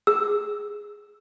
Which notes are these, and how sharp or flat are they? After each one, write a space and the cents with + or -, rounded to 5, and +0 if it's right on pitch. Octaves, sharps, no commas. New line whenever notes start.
G#4 +0 E6 +0